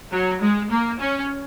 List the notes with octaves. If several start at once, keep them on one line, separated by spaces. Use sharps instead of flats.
F#3
G#3
A#3
C#4